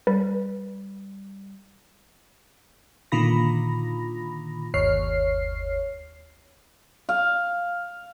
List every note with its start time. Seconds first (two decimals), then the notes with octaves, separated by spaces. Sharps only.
0.07 G3 B4
3.12 A#2 D3 D#3 F4 B5 A#6
4.74 G1 D#2 C#5 F6 C7
7.09 F5